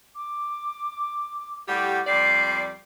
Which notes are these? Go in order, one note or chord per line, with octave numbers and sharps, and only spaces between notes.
D6
A2 G3 G4 F#5
F2 G3 D5 C7